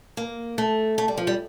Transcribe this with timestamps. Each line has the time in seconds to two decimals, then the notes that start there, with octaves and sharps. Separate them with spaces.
0.17 A#3
0.58 A3
0.98 A3
1.08 G3
1.18 F3
1.27 G3